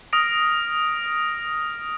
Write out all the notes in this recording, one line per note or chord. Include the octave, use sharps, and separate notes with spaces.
D#6 F6 A#6 D7